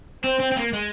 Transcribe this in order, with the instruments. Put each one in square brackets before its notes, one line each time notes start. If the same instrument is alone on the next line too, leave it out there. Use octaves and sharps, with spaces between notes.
[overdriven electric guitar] C4 [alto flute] C5
[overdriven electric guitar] C4
C4
A#3
G#3